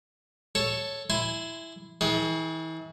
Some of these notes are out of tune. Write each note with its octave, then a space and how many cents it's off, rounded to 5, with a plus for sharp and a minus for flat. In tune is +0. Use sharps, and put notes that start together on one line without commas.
A4 +0 C#5 +0
E4 +0 G#5 +0 C6 -20
E3 -40 G#4 +30